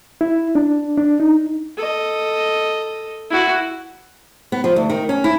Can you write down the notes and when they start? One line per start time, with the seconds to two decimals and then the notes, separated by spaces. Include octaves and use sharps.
0.21 E4
0.55 D4
0.97 D4
1.20 D#4
1.77 A4 D#5
3.30 E4 F#4
4.52 B3
4.64 F3
4.76 D2
4.90 D#3
5.09 C#4
5.24 E4